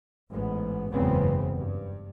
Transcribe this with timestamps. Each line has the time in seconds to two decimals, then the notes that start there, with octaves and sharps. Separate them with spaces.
0.30 A1 G#2 B3
0.91 F#1 E2 G#2 C#3 B3 C4
1.56 G2